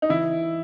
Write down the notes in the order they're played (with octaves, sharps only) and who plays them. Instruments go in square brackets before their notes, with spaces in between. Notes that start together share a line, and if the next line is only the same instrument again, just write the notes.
[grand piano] D#4
[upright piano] E3 [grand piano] E4